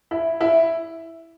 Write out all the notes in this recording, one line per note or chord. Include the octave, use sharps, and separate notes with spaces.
E4
E4